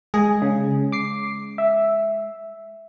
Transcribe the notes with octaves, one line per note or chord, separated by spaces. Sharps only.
G#3 G#4 G#5
C#3
D6 C7
E5